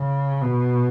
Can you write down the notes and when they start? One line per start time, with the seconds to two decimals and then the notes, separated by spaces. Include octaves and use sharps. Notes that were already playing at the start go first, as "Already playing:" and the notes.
Already playing: C#3
0.42 B2